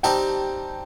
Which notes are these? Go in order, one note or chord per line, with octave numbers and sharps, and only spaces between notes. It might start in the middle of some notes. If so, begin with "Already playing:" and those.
G3 C4 D#4 G4 G5 A5